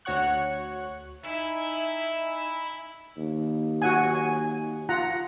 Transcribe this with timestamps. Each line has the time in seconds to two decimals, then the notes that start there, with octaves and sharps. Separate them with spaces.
0.05 D2 F#4 C#5 F#5 C#6 F#6
1.25 D#4 E4 E5 G#5
3.18 D#2
3.82 F#4 F#5 G#5
4.15 G#5
4.89 F4 F#5 A#5